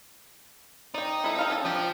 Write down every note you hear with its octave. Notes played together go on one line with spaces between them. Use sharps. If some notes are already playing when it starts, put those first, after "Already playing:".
D#4 D5 G5
E4 A4
A4 F5 G5
C#4 A4
F3 D4 G4 D5